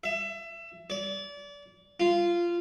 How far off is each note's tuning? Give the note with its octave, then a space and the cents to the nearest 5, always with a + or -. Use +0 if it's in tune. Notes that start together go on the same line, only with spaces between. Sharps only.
E5 +25
D5 -30
F4 -15